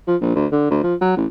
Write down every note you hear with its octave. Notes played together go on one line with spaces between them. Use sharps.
F3
A#1
D2
D3
D2
F3
F#3
A1